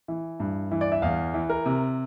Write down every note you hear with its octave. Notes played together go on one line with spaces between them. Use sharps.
E3
G2
E3
D5
E5
E2 F5
E3
A#4
C3